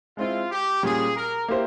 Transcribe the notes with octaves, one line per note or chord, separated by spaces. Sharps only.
G#3 C4 E4 F4
G4
A#2 G3 C#4 G4 G#4
A#4
A#3 E4 G4 C5